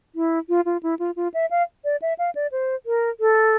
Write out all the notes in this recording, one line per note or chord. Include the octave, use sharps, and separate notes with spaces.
E4
F4
F4
E4
F4
F4
E5
F5
D5
E5
F5
D5
C5
A#4
A4